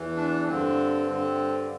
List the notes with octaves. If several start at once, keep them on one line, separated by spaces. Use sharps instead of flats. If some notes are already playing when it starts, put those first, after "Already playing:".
Already playing: E2 E3
D4
G2 D3 C4
G2 D3